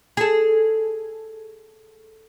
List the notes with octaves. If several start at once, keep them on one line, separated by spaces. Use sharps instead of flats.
G#4 A4